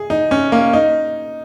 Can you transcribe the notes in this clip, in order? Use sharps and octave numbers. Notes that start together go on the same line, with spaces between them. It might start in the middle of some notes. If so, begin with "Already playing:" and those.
Already playing: G#4
D#4
C#4
A#3
D#4